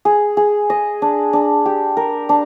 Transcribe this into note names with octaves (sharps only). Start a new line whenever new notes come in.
G#4
G#4
D#5
D4
D4
G4
A#4
D4